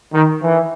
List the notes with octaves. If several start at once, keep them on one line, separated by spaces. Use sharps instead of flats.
D#3
E3